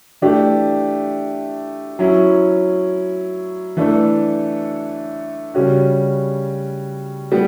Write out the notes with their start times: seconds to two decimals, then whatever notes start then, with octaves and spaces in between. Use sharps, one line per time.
0.22 E3 A3 D4 G4
1.99 F#3 C#4 E4
3.77 E3 A3 D4 A4
5.54 C#3 G3 C#4 F#4
7.32 G3 B3